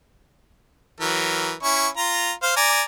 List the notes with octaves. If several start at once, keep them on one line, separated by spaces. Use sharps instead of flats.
E3 F#3 A#4
C#4 E4 C#6
F4 A#5
C5 F5
D5 G#5 A#5